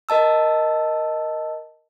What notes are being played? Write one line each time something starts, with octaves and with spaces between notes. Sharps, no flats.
A#4 D#5 A5 E6